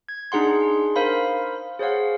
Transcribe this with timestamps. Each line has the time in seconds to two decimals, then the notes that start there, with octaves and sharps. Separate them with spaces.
0.09 G#6
0.32 D4 D#4 G#4 F#5 C6
0.96 A#4 C5 F5 B5
1.79 G#4 C5 C#5 F5 F#5